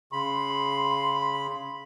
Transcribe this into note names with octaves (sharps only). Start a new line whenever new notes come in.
C#3 B5 C6